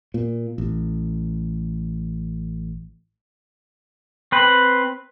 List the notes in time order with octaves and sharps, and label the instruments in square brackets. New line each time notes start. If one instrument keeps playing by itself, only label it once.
[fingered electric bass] A#2
A1
[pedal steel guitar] C4 B4